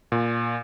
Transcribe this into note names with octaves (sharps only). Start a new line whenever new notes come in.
A#2